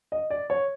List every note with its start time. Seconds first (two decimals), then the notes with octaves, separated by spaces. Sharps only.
0.12 D#5
0.30 D5
0.50 C#5